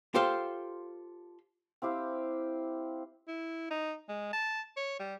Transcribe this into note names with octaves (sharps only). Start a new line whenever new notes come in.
F4 G4 A4 C5 F5
C4 E4 G4 F5
E4
D#4
G#3
A5
C#5
G3